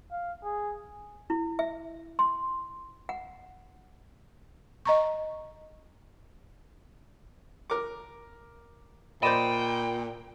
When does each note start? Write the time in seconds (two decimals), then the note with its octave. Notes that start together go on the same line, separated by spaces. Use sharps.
0.12 F5
0.44 G#4
1.30 E4
1.59 E5
2.19 C6
3.09 F#5
4.85 D#5 A#5 C#6
7.70 A#4 D6
9.23 A#2 C5 D5 D#5 G5 B5 D#7 E7